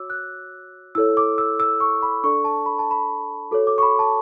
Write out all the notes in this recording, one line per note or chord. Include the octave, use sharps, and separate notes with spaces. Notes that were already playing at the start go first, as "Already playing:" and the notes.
Already playing: F#4 C#5 D6 E6
F#6
E4 A4 C#5 E6
D6
E6
E6
C#6
B5
D4 A4 D5 C#6
A5
B5
A5
B5
F#4 A4 C#5 D6
D6
C#6
B5
A5